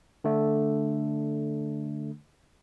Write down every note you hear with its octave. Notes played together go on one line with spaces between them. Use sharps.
D3 A3 D4